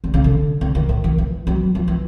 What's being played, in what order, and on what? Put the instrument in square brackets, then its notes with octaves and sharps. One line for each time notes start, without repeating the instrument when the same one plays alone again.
[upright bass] D3
C#3
D3
D3
D#3
A2
D#3
E3
F#3
F3
E3